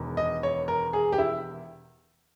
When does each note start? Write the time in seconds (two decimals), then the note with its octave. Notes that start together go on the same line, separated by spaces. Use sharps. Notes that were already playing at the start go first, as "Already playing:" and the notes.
Already playing: E1 E2 D#3
0.17 D#5
0.43 C#5
0.68 A#4
0.93 G#4
1.12 G4
1.18 E4